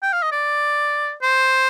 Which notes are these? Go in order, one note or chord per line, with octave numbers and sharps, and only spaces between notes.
G5
F5
D#5
D5
C5